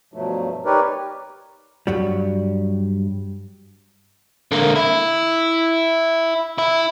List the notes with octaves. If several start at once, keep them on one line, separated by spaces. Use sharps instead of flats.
G2 B2 F3 F#3 A3
D#4 G4 A#4 B4 C#5 D5
G2 F#3 G3
D3 A#3
E4
E4